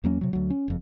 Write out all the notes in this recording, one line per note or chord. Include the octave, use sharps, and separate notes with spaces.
E2 F#3 A#3 C#4
C3 F#3
D2 F#3
C#4
F#1 F2